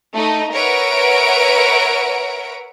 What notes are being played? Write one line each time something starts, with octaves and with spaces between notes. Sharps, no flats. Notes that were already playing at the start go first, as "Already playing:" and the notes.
A3 D#4
A#4 B4 C#5 E5 F#5 D7